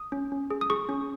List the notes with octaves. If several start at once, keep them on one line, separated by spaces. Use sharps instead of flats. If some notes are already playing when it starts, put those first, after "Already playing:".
Already playing: D#6
C#4
C#4
G#4
D#6
G#4 C#6
C#4